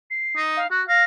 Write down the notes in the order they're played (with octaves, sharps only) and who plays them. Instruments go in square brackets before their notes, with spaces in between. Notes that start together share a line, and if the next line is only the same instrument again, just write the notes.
[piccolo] C7
[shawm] D#4
[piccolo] F5
[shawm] F#4 [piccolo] F#6
[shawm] F5 [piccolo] A#6